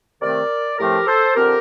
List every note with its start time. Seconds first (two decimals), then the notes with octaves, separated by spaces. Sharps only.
0.21 C3 D#3 A3 C4 A#4 D5
0.78 A2 F3 A3 C4 G4 A#4
1.06 A4 C5
1.35 D3 F3 C4 G4 A#4